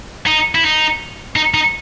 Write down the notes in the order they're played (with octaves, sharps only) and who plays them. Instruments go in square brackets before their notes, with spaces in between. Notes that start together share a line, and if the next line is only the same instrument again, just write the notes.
[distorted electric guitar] D#4
E4
D#4
D#4
D#4